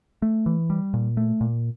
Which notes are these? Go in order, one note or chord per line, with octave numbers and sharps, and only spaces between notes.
A3
E3
G3
A#2
A3
A#2